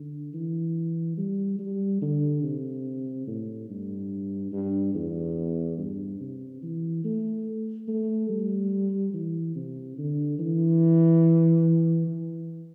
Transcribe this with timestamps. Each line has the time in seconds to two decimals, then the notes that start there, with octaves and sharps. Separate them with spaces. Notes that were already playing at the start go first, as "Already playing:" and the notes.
Already playing: D3
0.33 E3
1.18 G3
1.59 G3
2.01 D3
2.43 C3
3.27 A2
3.69 G2
4.52 G2
4.95 E2
5.78 G2
6.20 C3
6.63 E3
7.04 A3
7.88 A3
8.29 G3
9.13 E3
9.55 C3
9.98 D3
10.39 E3
12.07 E3